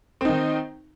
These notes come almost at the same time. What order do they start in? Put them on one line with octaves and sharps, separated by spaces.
C4 D#4 D#3